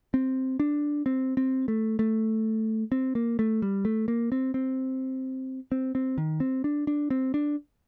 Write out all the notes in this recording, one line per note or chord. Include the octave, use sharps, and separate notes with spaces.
C4
D4
C4
C4
A3
A3
C4
A#3
A3
G3
A3
A#3
C4
C4
C4
C4
D#3
C4
D4
D4
C4
D4